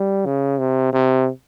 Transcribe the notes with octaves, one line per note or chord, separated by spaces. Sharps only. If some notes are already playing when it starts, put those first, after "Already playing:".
Already playing: G3
C#3
C3
C3